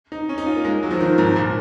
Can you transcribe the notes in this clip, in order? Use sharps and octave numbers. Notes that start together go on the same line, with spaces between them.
D#4
C#4
D#4
F4
A#3
G#3
F#3
F3
D#3
G#2
A#2